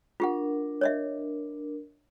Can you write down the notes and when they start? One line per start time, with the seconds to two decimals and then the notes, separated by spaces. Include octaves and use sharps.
0.20 D4 F4 G4 A#4 F#5
0.81 C#5 D#5 E5